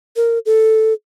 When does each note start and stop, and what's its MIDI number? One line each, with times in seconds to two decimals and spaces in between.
0.16 0.39 70
0.46 0.93 69